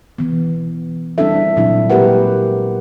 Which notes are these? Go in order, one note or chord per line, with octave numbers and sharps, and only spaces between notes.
E3 B3
G3 C4 D4 E4 A4 E5
A#2 F#3 D4 E4
G#3 A#3 G4 A#4 B4 F#5